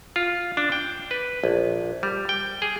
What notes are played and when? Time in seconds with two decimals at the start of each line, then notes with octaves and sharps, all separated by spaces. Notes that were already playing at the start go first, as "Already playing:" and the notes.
0.16 F4
0.57 D4
0.72 G5
1.11 B4
1.44 A#1
2.03 G3
2.29 G5
2.62 G#4